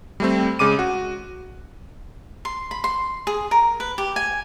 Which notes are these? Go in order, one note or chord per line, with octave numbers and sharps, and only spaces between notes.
G3 A3 C4
C#3 G#3 D6 D#7
F#4
C6
B5
C6
G#4
A#4
B4
G4
G#5